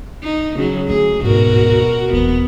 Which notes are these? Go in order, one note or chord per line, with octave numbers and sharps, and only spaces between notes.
D#4
C#3 F#3
D3 A3 G#4
D1 G#2 B2 F#4 A#4
D#1 E3 B3